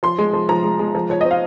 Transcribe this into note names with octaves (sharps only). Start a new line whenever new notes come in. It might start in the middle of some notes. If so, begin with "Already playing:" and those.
F3 C6
G#3
F3
F3 A#5
G#3
G#3
F3
F3 C#5
C4 D#5
F5